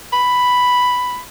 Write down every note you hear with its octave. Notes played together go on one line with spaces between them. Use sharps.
B5